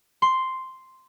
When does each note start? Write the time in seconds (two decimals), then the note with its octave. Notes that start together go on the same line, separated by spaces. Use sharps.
0.22 C6